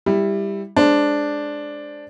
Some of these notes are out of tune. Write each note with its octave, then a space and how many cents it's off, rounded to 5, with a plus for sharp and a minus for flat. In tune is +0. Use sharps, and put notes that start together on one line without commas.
G3 +15 E4 +0 G4 +15
G#3 +10 D4 +0 C5 +0